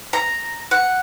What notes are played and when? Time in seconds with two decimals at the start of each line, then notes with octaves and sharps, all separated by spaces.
0.13 A#5
0.71 F#5